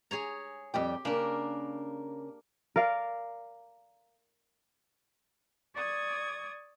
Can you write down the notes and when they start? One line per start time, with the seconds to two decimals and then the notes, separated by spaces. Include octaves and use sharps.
0.11 G#4 C#5 A#5
0.74 F2 G3 G4 G5
1.05 C#3 A#3 D4 A#4
2.76 A#4 D5 F5
5.74 D5 C#6 D#6 G#6